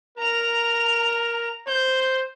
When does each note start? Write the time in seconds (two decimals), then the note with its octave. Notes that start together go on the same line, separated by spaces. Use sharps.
0.18 A#4 A#5 F7
1.68 C5 G6